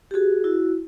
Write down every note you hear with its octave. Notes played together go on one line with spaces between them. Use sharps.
G4
F#4 G#4
E4 F#4